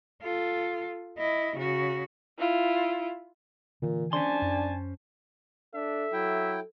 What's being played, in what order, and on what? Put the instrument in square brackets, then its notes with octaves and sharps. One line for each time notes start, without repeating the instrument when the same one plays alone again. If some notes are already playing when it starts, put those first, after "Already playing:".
[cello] F4 A4
E4 D#5
C#3 F#4
[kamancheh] E4 F4
[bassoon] A#2 [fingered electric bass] D3 E3
[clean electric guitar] C#4 C5 C6 [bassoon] D4 [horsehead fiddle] G#5 A5
[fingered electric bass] F#2
[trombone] D4 [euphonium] A4 [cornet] E5
[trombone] F#3 [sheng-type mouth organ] E4 G5